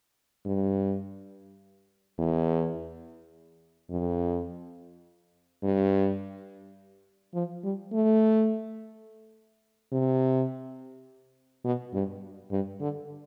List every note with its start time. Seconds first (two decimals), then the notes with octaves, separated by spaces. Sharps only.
0.46 G2
2.18 E2
3.91 F2
5.63 G2
7.34 F3
7.64 G3
7.93 A3
9.93 C3
11.65 B2
11.94 G2
12.51 G2
12.81 D3